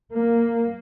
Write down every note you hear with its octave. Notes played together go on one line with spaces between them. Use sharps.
A#3